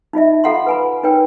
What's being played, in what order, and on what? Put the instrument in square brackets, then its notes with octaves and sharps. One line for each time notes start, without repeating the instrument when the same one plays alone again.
[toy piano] D#4 F4 D#5 E5
F4 A4 F5 F#5 A#5 C6
B4 G#5 B5
D#4 A#4 B4 C#5 G5